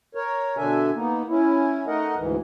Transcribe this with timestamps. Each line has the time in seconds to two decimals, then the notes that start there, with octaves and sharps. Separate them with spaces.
0.15 A#4 C#5
0.57 B2 D3 D4 A4 E5 G#5
0.95 A#3 B3 D#4
1.28 C#4 E4
1.87 A3 D#4 A#4 D#5 F#5
2.16 D2 G#2 E3